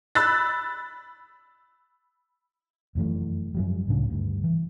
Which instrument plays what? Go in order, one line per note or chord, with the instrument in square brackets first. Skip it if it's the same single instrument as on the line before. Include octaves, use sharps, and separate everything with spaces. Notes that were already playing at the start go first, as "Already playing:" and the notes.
[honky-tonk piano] B5 E6 F#6 A6
[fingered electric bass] F1 F#2 E3 A3
F#2 F3 G3
C#2 A2 C#3 D4
D2 G2
E3